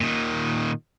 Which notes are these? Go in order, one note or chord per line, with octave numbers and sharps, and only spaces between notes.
A#2 D#3